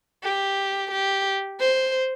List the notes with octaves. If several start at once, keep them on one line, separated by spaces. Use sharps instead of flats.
G4
G4
C5